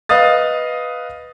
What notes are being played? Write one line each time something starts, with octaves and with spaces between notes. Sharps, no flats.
B4 D#5 F5 D#6 A6